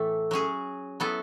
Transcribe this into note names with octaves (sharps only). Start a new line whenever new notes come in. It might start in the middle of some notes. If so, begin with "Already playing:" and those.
Already playing: A2 E3 A3 A4
F#3 C#4 G#4
F#3 B3 E4 A4